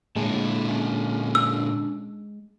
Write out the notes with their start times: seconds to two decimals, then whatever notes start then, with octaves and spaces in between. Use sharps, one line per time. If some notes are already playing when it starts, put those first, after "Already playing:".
0.16 A#2 D3 G#3 E4 A5
0.68 C#4 D4
1.35 E6